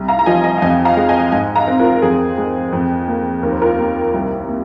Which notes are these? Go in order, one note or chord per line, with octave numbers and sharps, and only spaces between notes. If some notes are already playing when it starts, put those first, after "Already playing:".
Already playing: C2
F5 A#5
A#5
F3 D#5 G#5
D#5 G#5
F5
F2 D#5 G#5
F5 A#5
G#3
D#5 G#5
G#2 D#5 G#5
F5 A#5
C4
F4 A#4
F2 G#4
G#3
F2
A#3
D#2 A#4
C5
F4 A#4
A#3
C2
A#3